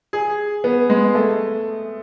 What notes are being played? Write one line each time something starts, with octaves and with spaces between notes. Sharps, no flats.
G#4
B3
G#3
A3